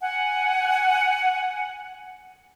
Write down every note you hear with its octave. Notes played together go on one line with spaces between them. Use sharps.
F#5 G#5